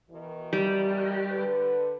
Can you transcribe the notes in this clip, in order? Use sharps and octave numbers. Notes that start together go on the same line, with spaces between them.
B2 D#3 E3
G3
D3 B4